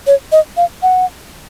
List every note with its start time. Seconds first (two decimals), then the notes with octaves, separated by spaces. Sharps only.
0.07 C#5
0.32 D#5
0.57 F5
0.83 F#5